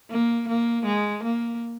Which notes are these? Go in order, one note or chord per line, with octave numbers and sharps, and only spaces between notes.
A#3
A#3
G#3
A#3